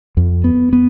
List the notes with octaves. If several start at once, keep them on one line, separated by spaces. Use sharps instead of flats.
F2
B3
B3